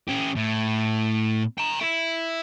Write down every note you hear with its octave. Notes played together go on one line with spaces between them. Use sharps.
C#4 G4
A2
G5 A#5
E4